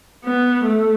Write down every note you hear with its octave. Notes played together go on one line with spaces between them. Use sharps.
B3
A3